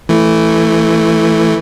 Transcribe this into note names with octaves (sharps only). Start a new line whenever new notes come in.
E3 A3